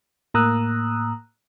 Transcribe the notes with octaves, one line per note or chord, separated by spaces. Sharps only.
A2 A#3 A#5 D#6 E6 F#6